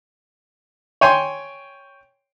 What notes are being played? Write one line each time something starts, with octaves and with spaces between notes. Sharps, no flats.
C#5 G5 G#5 C6